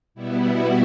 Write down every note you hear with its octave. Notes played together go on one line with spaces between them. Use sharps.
B2 G3 B3 E4
F#4